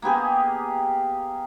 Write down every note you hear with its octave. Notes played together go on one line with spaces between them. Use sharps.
A#3 B3 G4 G#4